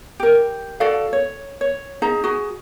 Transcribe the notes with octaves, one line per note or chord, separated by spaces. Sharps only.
G4 A#4
F#4 A4 D5 F5
C#5
C#5
D#4 G#4 A#5
F#4 G#4